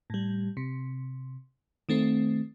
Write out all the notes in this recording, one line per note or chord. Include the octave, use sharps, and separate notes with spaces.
A2 G3
C3
D#3 A3 C4